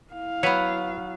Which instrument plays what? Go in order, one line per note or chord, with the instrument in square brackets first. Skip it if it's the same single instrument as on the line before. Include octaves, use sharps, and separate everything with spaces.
[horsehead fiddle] E4 F5
[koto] F#3 B3 [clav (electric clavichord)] B4 C#5